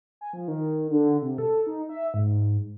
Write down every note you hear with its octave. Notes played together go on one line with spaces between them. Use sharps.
G#5
F3
D#3
D3
C3
A4
D#4
E5
G#2